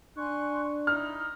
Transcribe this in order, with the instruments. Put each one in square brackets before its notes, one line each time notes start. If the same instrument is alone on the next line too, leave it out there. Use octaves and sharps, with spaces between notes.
[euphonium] D4 [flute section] G#5 C6 F#6 [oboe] C#6
[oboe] D#4 [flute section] E4 [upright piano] F6